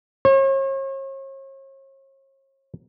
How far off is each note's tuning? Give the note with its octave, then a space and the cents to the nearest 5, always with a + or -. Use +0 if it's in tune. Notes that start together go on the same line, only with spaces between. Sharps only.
C#5 -40